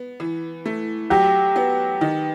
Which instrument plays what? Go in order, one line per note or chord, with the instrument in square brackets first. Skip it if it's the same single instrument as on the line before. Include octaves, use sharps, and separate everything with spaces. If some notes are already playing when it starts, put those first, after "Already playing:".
Already playing: [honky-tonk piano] B3
E3
A3
[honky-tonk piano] F#3 [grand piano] G4
[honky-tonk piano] B3
D#3